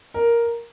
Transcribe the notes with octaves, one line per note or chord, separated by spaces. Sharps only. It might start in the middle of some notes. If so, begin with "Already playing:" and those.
A#4